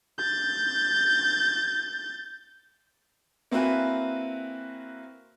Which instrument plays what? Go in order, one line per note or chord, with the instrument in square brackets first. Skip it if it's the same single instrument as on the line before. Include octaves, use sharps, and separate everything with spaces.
[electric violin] G6 A6
[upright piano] A#3 C4 E4 F#4 B4 G#5